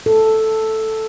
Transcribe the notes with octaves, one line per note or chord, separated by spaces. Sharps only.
A4